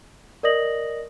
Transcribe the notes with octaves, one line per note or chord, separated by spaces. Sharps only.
A#4 D5 D#5 D#6 A#6 F#7